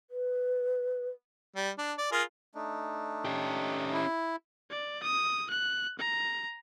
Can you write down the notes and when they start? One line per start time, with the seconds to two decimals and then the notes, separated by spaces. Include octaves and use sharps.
0.10 B4
1.56 G3
1.78 D4
1.98 D5
2.12 F4 G#4 A#4
2.55 A3 D4 D#4
3.25 C#4 G4
3.93 E4
4.70 D5
5.03 D#6
5.50 F#6
5.99 A#5